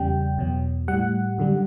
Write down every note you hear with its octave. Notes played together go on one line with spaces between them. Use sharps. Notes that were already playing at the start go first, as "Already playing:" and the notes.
Already playing: E2 C#3 G3 G5
E2 B2 F#3
A2 G3 F#5
F#2 D3 G3